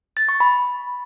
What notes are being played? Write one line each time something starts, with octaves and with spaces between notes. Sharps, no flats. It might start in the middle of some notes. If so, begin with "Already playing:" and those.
A6
C#6
B5